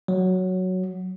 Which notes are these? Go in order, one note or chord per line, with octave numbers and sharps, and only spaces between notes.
F#3